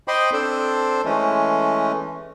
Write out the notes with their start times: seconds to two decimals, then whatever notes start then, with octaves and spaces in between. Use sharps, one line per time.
0.08 C5 D#5 G5 B5 C6 D6
0.33 C4 D4 A4 C5
1.05 E3 G#3 A3 C#4